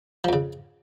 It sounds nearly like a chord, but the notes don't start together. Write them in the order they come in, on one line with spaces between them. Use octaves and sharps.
F3 F2 C#3